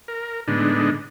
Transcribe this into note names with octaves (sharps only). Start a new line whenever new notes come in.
A#4
A2 D3 G#3 B3 D4 D#4